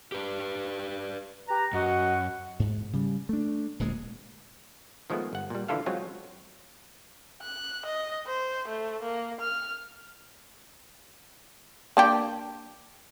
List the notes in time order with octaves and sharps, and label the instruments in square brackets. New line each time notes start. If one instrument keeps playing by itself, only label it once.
[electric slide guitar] G4 B4 D5
[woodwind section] G4 B4 A#5
[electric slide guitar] F#2 [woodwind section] F#4 D#5 F#5
[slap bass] G#2
C#3 G3
A3 D4
D1 A#2 G#3
[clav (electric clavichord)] D#3 F3 G#3 A3 B3
G1 F#5
A#2 G3
D3 E3 E4 F4 A4 F5
F#3 G#3 C4 F4
[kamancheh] F#6
D#5
C5
A3
A#3
F6
[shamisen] A#3 D4 G4